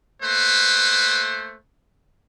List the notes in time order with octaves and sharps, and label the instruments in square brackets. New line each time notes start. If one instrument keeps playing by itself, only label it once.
[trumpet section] A3 A#3 B4 C5